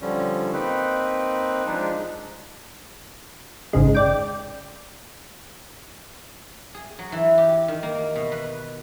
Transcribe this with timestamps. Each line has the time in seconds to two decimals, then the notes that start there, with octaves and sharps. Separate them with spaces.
0.01 D3 F3 G3 C#4
0.53 A#3 C4 D#4 B4
1.67 F3 G#3 D4 D#4
3.73 G#1 C#3 G#3
3.95 D5 G5
6.74 G#4
6.99 F#3
7.12 E3
7.38 G4
7.68 D#3
7.83 A#3
8.16 B2
8.32 B4